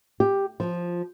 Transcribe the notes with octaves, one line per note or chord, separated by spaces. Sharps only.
G4
F3